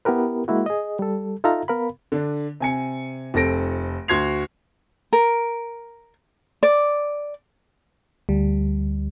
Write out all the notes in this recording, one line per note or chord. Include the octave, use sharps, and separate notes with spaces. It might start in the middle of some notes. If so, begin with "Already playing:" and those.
B3 E4 G4 A#4 B4
G#3 A#3 E4 F#4
G#4 D#5
G3 A4
D#4 F4 A4 E5 F5 A#5
B3 A#4 F5 B5
D3 D4
C3 G#5 C#7
F1 C4 A4 A#6 D7
D2 F#4 C6 G#6 C7 F7
A#4
D5
D2 G3